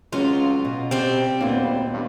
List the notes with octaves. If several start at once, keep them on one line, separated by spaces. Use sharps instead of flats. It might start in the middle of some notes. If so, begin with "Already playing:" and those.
C#2 F#3 C4 C#4 F4
B2
C3 G3 C4
D1 D#2 A#2 A#3 B3
G2